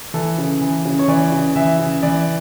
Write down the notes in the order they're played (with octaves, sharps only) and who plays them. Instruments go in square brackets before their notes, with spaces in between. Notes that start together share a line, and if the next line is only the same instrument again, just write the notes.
[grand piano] E3 A4
C#3
E3
C#3
C#5
E3 D5
C#3
E3 E5
C#3
E3 D5